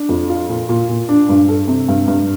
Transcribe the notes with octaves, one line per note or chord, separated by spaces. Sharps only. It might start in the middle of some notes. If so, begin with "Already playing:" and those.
Already playing: D4
F2
F4
A#2
A#2
A#2
D4
G2
A4
C3
G2
G2